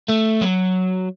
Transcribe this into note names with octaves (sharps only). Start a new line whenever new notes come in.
A3
F#3